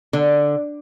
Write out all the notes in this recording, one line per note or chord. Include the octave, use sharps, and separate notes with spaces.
D3